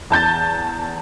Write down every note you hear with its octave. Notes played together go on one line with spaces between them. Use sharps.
E2 A5 G6 A6